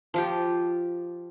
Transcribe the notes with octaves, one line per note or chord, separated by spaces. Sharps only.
F3 F4 G4